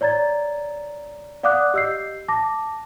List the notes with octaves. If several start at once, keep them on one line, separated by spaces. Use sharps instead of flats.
C#5 D5 A#5 G#6 A6
D5 F5 F#5 D6 D#6 F#6
G4 D#5 E6 G6 C7
A5 D6 A#6